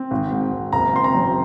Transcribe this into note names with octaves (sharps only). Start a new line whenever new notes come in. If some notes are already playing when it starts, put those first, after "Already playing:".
Already playing: C4
G#1
G#2
G#1
F#1 A#5
C4 C6
A#5
F#2